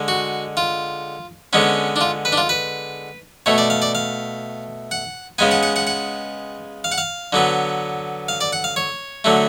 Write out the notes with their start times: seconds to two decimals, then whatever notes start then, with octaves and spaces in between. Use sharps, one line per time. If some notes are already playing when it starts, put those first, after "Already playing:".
Already playing: D3 G#3
0.08 F#4
0.57 F4
1.53 D3 G#3 B3 C#4
1.96 D4
2.01 F4
2.25 B4
2.32 D4
2.38 F4
2.49 B4
3.46 B2 A3 C#5
3.58 D5
3.70 F5
3.82 D5
3.95 F5
4.91 F#5
5.38 C#3 G#3 B3 G#5
5.51 F#5
5.63 F#5
5.76 F#5
5.87 F#5
6.84 F5
6.92 F#5
6.98 F5
7.33 D3 F#3 B3
8.28 F5
8.41 D5
8.53 F#5
8.64 F5
8.76 C#5
9.24 D3 F#3 A3